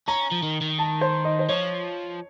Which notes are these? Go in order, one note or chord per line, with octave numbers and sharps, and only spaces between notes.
C#4 A#5
F3
D#3
D#3
A5
C5
D#5
C5
F3 C#5